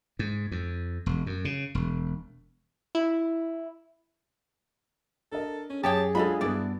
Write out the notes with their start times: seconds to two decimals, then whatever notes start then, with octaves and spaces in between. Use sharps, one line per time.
0.19 G#2
0.51 F2
1.06 E1
1.26 F#2
1.45 C#3
1.75 E1
2.95 E4
5.32 D4 A4 A#4 D#5
5.70 C#4
5.83 F#2 G4 G#4 C#5 G5 A5
6.15 F#3 G#3 D4 F4 A4 D#5 B5
6.41 G2 B3 D4 E4 F#4 D5